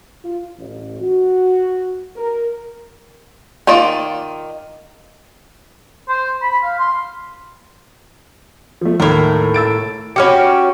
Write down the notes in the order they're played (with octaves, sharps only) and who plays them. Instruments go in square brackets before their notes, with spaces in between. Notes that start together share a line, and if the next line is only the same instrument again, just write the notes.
[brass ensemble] F4
A1
F#4
A#4
[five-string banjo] D#3 A#3 F4 D5
[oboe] C5
B5
F5
C6
[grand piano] F3 A3
[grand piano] D#2 [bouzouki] A2 A#4
[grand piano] E6 A6 D7
[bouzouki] C#4 F#4 G4 [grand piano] B5 F6 C#7